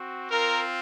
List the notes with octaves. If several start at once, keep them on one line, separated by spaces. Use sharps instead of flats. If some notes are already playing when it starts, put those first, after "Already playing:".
Already playing: C4 F#4
C4 F4 A#4